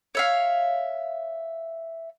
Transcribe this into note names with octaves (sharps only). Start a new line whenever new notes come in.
C#5 E5 F5